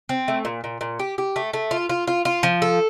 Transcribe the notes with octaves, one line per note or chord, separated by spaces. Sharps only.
C4
A3
A#2
A#2
A#2
G4
G4
A3
A3
F4
F4
F4
F4
F3
A4